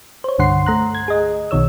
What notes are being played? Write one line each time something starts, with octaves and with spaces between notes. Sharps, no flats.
C5 C#5
C2 G2 D3 F#5 C6 C7
A3 A#5 F#6
G#6
G#4 D#5
B1 B2 D#3 C#5 E6